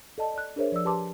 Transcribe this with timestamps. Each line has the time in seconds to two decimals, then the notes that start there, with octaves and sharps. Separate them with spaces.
0.18 A4 D5 D#5 A5
0.34 D5 F#6
0.56 D4 G#4 A#4 C5 C#5 E5
0.72 F3 D5 E6
0.85 G4 B4 A5 C6 D6